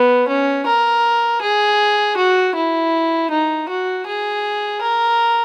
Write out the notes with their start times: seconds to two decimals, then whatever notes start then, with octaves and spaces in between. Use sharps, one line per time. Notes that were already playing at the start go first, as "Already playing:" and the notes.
Already playing: B3
0.28 C#4
0.67 A#4
1.42 G#4
2.17 F#4
2.56 E4
3.31 D#4
3.69 F#4
4.07 G#4
4.82 A#4